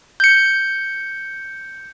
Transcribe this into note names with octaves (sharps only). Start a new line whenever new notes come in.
G6 C#7